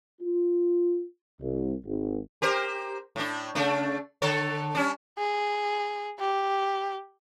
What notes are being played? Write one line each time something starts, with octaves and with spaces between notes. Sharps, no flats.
F4
C2
G#1
G4 A#4 C5
A2 D4
C#3 A3 D4
D3 A4 C#5
G3 C#4 D4
G#4
G4